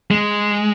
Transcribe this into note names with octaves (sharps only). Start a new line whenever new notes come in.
G#3